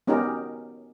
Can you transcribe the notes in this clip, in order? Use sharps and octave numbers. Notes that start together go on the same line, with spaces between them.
B3 C#4 D#4 F#4 G4 A#4